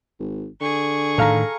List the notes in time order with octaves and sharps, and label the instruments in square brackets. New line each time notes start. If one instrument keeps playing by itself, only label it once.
[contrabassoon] G#1
[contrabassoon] D3 [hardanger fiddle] G#4 C#6
[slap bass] A2 D#3 [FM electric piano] A4 F5 A#5